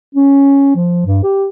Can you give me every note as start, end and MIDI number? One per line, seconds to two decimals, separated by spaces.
0.15 0.74 61
0.75 1.05 53
1.06 1.21 43
1.23 1.47 67